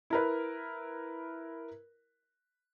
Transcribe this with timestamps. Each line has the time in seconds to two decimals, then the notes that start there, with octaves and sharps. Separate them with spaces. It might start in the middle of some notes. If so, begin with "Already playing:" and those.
0.10 E4 A#4 B4